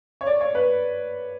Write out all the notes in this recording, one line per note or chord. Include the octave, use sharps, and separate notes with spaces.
C#5
D5
C#5
B4